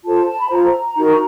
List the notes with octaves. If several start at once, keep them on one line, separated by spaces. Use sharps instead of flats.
F4 A4 C5 A5
A5
B5
F4 A4 C5 A#5
D#4 F#4 A#4